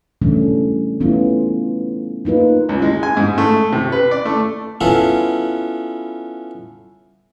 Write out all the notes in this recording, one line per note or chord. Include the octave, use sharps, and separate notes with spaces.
C#3 E3 G3 A3 C#4 D4
E3 A3 B3 C#4 E4 F4
A#3 D#4 F4 B4
C#2
G#3
G#5
G#2
A3
C3
B4
D5
A3
B3 C#4 E4 F4 A4